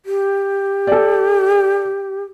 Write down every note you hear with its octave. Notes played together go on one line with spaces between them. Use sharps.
G4
A4 D5